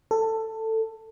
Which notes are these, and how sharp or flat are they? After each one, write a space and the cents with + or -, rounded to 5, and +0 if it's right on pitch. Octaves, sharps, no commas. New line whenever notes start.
A4 +15